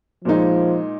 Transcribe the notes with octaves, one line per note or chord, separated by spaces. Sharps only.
A#2 F3 G#3 D#4